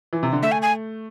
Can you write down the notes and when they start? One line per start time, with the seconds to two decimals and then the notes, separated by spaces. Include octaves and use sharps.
0.13 E3
0.23 C3
0.33 D3
0.42 A3 E5
0.52 G#5
0.62 G#5